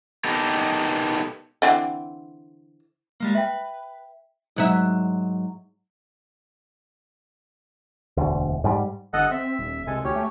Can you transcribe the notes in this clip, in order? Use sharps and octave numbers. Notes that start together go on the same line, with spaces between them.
B3 D#4 G4 A4 A#4
D3 E3 C4
G3 G#3 A#3
B4 E5 G5
G#2 F#3 E5
E1 D2
G#2 G3
G1 A4 D#5 F#5
C4 E5
D#1
C2 G#3 A4 G#5
D2 C#4 G4 C#5
A3